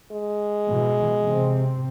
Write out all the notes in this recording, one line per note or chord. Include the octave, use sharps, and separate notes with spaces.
G#3
B2 E3
C3 C4